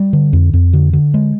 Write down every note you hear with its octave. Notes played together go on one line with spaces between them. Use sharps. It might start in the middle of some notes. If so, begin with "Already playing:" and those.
Already playing: G3
D3
F2
F2
D3
D3
G#3